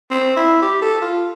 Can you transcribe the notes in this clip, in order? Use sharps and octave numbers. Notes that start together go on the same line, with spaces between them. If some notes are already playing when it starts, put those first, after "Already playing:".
C4
E4
G4
A4
F4